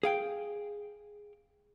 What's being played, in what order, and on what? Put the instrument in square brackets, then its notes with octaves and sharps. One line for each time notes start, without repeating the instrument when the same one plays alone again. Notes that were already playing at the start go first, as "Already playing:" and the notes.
[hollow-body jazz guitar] G#4 F5 G5